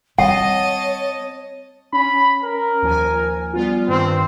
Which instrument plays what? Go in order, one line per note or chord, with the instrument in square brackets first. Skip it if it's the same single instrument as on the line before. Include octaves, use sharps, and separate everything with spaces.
[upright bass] G3 C4 [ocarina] C#5 [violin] D#5 A5 [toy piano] F#5
[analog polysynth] C#4 [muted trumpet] B5
[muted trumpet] A#4
[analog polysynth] D#2 F3 G#5
G3 B3 F4
[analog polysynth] G2 D#3 [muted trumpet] C4